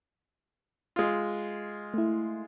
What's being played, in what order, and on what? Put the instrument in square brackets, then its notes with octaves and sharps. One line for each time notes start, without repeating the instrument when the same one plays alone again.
[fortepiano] G#3 F4
[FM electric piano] A3 E4